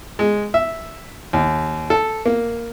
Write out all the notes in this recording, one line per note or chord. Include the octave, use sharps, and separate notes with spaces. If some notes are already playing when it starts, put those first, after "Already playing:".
G#3
E5
D#2
A4
A#3